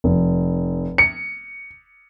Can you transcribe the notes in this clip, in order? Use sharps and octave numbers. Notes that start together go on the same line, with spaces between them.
F1
C#7